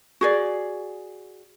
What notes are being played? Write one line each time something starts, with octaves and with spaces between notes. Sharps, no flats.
F#4 G#4 D5